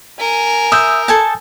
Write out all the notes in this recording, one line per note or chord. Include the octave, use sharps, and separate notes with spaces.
A#4 G#5
E5 D#6 E6 G6
A4 G#5 A5